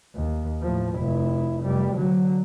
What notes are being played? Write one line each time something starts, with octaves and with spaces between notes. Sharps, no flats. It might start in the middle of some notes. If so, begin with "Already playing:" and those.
D#2
A2 F3
F1 E4
F1 G3
D3 F#3